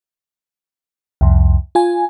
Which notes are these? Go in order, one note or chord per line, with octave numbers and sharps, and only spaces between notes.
C2 F2
F4 G#5